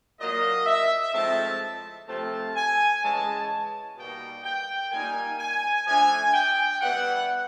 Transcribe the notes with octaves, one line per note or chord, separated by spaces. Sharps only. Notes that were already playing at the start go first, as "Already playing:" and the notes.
A#2 F#3 A#3 D#5
E5
A2 F3 G#3 C4 D#4 A5
C3 F3 A3 C4 A5
G#5
C#3 E3 G#3 A5
B2 G3 A#3 D#4 G5
G5
A#2 G3 A#3 D#4 G#5
G#5
F3 A3 D4 G#5
G5
E3 G3 B3 F#5